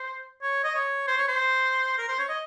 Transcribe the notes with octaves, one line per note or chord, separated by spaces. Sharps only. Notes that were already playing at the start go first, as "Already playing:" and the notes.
Already playing: C5
C#5
D#5
C#5
C5
C#5
C5
A#4
C5
C#5
D#5